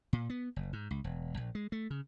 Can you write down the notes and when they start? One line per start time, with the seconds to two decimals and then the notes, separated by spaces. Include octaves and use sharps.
0.13 A#2
0.30 B3
0.56 F#1
0.73 G#2
0.91 C#2
1.04 E1
1.37 A#1
1.55 G#3
1.72 A3
1.90 C#3